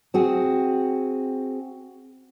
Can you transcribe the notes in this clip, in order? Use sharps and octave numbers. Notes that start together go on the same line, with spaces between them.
C4 F#4 G#4